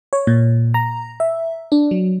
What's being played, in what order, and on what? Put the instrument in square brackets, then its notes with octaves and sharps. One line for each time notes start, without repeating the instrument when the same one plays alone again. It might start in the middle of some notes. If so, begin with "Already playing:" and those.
[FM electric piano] C#5
A#2
A#5
E5
D4
F#3